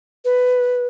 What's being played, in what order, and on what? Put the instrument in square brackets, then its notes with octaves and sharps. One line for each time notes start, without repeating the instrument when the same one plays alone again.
[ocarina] B4